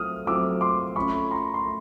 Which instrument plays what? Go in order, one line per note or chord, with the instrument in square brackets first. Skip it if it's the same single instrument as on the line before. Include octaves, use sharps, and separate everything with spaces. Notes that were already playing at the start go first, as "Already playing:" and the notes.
Already playing: [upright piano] F#3 A3 C4 F4 [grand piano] D#6 F6
[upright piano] F#3 A3 C4 F4 [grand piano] D6 E6
[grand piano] C6 D6
[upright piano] A3 C#4 F4 [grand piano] B5 C#6
[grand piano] A#5 C6
C6
[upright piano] A3